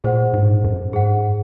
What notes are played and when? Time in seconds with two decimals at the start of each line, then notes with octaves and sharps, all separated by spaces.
0.04 A#2 G#4 C5 F#5
0.34 G#2
0.64 F#2
0.93 G#2 G#4 C5 F#5